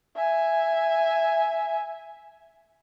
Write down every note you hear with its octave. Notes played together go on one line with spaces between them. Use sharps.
E5 G#5